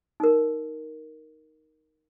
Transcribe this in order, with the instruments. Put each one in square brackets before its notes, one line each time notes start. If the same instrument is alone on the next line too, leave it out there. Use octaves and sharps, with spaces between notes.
[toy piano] D#4 A#4